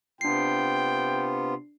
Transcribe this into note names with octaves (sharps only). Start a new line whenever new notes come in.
C3 B3 D4 F4 G5 C7